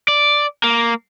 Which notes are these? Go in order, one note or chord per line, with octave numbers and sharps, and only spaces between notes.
D5
A#3